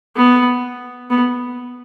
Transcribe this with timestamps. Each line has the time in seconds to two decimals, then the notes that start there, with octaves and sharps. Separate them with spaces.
0.16 B3
1.10 B3